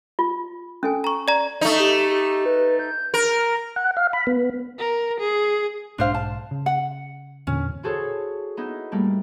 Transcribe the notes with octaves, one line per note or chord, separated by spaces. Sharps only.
F4
C#4 A4 G#5
A#5 C#6
D5 A#5
A3 D#4 D#5
G4
G4
B4
G6
A#4 A#6
F#5
F5
B5
B3
A#4
G#4
B1 G#2 D4 C5 F5
A5
C#3
F#5
E2 A#2 D3 C#4
E4 F#4 G#4 A4 C5 C#5
B3 D#4 E4
A2 G3 A3 A#3